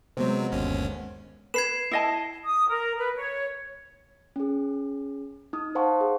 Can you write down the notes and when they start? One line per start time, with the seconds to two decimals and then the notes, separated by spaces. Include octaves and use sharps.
0.17 C3 F#3 G#3 B3 C5
0.51 G1 D#2 C#4
1.54 B4 G#6 C7 E7
1.91 E4 D#5 A5
2.45 D#6
2.69 A#4
2.98 B4
3.15 C#5
4.36 C#4 G#4
5.53 D#4 D#6
5.75 C5 F5 F#5 A5 C6 C#6
6.01 G#4